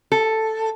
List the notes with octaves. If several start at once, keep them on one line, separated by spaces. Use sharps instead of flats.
A4